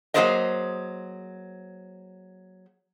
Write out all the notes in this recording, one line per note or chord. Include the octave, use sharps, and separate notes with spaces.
F#3 A#3 G#4 C5 D5 D#5